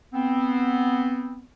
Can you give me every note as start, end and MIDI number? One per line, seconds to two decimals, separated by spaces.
0.14 1.44 59
0.14 1.44 60